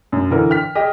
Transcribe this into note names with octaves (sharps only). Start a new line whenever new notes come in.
F#2
D3 E3 A#4
G5 F6 B6
G4 G#4 D#5